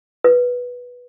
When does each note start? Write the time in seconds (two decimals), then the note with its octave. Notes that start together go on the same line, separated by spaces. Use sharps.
0.24 B4